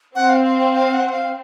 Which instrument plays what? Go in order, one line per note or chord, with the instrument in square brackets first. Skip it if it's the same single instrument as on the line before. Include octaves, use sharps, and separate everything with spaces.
[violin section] C4 [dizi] F#5
[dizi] F5
F5
F5
F5
F#5
F5